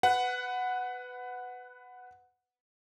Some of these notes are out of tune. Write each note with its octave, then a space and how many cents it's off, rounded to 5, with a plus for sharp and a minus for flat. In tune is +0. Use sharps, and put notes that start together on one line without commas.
B4 +15 F#5 -5